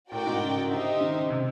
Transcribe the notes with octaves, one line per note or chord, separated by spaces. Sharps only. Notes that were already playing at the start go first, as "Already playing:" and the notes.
A2 F#4 A#4 D5 G5
G#2
C#3
D3 D#4 G4 C5 E5
D#3
C#3
C3